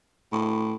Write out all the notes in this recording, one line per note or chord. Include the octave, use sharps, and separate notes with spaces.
A2